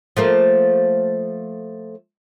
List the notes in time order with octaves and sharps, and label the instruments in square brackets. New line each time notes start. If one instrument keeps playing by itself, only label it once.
[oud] F3 A3 A#3